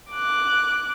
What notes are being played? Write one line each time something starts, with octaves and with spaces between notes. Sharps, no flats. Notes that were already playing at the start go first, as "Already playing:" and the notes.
D6 F#6